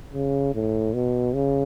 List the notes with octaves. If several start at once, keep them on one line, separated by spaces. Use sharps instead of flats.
C#3
A2
B2
C#3